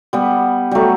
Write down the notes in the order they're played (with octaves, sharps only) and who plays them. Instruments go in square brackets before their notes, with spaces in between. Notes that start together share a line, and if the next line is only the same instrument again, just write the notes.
[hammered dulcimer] G3 B3
F#3 G3 A3